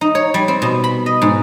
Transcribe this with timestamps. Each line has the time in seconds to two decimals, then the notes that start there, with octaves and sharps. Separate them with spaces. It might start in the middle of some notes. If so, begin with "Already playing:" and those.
0.01 D#4
0.15 C#5
0.34 G3
0.48 C4
0.62 B2
0.84 B5
1.06 D#5
1.22 G#2